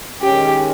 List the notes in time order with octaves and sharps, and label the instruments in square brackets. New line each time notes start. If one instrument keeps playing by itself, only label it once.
[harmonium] D#3 G#3 C#4 [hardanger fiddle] G4